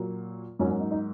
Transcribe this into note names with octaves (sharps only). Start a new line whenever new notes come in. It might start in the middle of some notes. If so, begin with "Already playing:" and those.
Already playing: A#2 F#3 A#3
G#2 F#3 A#3 C#4
C#4
D#4
D#4